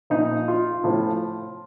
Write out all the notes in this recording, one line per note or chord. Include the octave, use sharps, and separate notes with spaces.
A#2 F3 D#4
F4
A2 F3